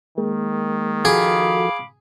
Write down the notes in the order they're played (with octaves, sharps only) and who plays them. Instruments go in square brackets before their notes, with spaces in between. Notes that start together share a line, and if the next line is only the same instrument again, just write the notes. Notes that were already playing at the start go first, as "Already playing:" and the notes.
[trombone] D#3 [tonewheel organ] G#3 A#3
[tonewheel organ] F3 F#4 A4 [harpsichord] G#4 [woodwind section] F5 B5 D6